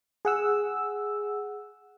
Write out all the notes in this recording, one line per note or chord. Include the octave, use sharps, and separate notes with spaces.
G#4 F#5 E6